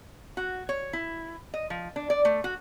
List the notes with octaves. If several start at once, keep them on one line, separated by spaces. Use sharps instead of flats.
F#4
C#5
E4
D#5
F3
D4
D5
A3
F#4